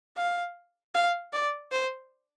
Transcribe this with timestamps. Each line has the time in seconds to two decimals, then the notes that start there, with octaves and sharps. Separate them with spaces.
0.17 F5
0.94 F5
1.33 D5
1.72 C5